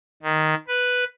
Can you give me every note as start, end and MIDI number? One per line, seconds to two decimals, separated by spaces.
0.23 0.54 51
0.68 1.04 71